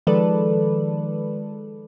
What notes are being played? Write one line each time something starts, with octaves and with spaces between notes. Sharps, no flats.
D#3 F3 G#3 A4 B4 D5